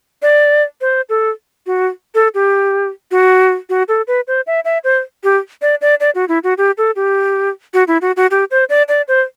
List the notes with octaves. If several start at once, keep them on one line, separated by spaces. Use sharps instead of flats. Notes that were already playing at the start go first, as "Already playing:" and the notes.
D5
C5
A4
F#4
A4
G4
F#4
F#4
A4
B4
C5
E5
E5
C5
G4
D5
D5
D5
F#4
E4
F#4
G4
A4
G4
F#4
E4
F#4
F#4
G4
C5
D5
D5
C5